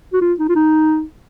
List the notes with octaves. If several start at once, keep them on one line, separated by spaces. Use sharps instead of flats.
F#4
F4
D#4
F4
D#4